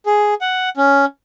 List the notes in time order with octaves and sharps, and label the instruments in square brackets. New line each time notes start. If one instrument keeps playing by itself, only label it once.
[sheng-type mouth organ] G#4
F#5
C#4